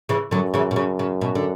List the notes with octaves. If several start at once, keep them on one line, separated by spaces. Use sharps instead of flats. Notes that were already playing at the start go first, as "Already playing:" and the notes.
C#3 E3
F#2 D3 F#3
C#3 E3
B2
C#3
C#3
B2
D3